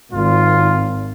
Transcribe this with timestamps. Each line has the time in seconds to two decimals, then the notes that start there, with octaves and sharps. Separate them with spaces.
0.13 G#1 F4